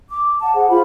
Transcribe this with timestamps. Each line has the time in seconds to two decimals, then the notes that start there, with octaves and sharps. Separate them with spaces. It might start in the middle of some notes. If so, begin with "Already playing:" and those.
0.10 D6
0.42 F#5 A5
0.54 G#4 C5 F#5
0.69 F4 C5 B5